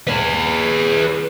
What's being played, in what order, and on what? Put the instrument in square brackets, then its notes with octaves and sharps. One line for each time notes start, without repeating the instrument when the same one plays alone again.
[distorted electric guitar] G#4 B4